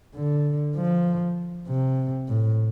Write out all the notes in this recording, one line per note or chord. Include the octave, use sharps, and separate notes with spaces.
D3
F3
C3
A2